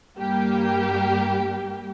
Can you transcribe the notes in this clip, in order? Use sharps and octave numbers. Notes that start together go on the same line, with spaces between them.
G2 G3 A#3 G4